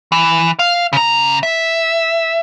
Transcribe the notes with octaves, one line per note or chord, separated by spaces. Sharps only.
E3
F5
C#3 A#5
E5